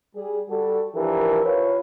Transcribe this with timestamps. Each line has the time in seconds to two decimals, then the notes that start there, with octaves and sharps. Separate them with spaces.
0.16 G3 G#4
0.49 G3 F#4 A4
0.95 E3 F3 D4 G4 A#4
1.45 F4 B4 C#5